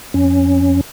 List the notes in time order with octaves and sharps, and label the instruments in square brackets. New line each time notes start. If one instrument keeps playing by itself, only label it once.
[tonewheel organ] F2 C#4